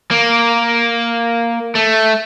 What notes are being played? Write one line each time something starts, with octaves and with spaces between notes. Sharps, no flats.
A#3
A3